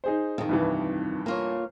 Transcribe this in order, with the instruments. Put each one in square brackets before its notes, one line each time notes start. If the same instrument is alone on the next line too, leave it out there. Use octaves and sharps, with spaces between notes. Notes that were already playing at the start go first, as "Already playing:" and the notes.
[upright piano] D#4 G#4 C5
[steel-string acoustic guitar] F2 D#3
[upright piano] C2 G2 E3
[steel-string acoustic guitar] A#3 F4 C#5